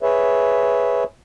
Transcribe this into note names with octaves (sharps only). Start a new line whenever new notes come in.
G#4 B4 C#5 E5